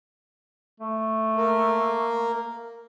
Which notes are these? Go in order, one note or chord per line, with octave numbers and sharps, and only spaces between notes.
A3
A#3